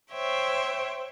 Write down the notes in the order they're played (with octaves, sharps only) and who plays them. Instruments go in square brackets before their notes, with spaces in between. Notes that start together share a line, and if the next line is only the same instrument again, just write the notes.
[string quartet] C5 C#5 E5 G5